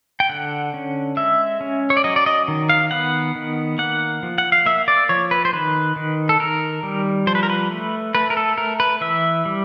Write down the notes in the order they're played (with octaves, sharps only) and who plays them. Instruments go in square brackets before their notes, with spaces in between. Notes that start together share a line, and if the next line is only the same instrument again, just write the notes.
[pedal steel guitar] G5
D3 F#5
C#4
G#3 E5
C#4
C#5
D5
F#3 D#5
D5
D#5
D#3
F5
B3 F#5
D#3
A#3 F#5
F3
F#5
F5
A#3 E5
D5
F3 C#5
B4
C5
D#3 B4
D#3
A4
D#3 A#4
G3
F3 C5
B4
A#4
B4
A3
A3 B4
A#4
A4
A3 A#4
B4
E3 E5
G3